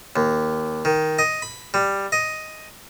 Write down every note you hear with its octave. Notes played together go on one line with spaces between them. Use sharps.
D#2
D#3
D#5
B5
G3
D#5